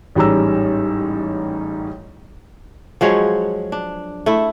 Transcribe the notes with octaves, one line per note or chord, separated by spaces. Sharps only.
A1 G#2 G3 C#4 A#5 E6
F3 F#3 G#3 C#5
D4
A3 E4